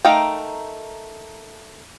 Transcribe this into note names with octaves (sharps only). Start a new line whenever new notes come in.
A3 D#4 A#4 F5 G5